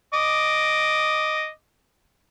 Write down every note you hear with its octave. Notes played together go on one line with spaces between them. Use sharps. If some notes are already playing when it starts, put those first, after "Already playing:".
D#5 D6